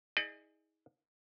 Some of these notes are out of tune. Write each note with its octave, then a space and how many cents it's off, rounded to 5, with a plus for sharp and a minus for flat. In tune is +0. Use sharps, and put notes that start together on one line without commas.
D#4 +45 G#4 +0 D5 +45